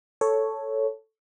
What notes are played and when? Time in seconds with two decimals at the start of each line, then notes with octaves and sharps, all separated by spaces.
0.21 A4 C#5